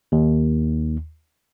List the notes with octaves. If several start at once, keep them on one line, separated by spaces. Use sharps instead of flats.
D#2